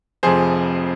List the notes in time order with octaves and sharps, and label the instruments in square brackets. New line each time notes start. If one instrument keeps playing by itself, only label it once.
[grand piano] F1 F2 C3 F3 G#4 C5